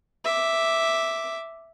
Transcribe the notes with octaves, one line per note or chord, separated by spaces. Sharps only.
E5 D6